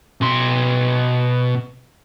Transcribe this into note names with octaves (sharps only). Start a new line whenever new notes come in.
B2 C6